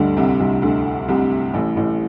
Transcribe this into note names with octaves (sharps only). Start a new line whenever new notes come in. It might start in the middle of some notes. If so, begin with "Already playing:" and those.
Already playing: D2 G2 D3 G3
C2 C3
C2 C3
D2 D3
C2 C3
A1 A2
A1 A2